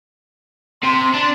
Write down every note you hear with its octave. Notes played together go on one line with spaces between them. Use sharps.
C3 C6
D4